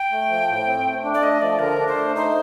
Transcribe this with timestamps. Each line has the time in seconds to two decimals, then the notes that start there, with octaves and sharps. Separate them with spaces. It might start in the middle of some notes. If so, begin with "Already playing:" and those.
Already playing: G5
0.11 A3
0.30 F3
0.49 A2
0.67 C4
0.86 A3
1.04 D4
1.14 D5
1.22 A3 D#5
1.41 F3 D5
1.59 D3 A#4
1.79 D4
1.88 C5
1.96 A3
2.15 D#4 C5